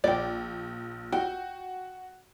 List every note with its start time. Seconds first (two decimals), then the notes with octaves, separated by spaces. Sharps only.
0.04 A#1 D5 G5
1.12 F#4 G5